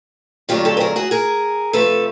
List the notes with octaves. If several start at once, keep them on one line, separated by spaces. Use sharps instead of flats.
F2 D3 F#3 A3 F4 G4
G4 A4
B4
G#4 A#4
F#4 G#4
G#4 A#4
C3 F3 A3 A4 B4